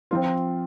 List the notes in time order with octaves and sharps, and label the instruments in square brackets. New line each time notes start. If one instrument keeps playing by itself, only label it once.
[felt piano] F3 C4 F4